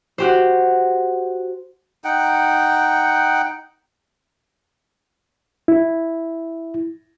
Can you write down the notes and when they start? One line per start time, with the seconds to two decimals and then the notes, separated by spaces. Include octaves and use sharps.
0.18 F#4 G4 C5
2.04 D#4 F#5 G5
5.68 E4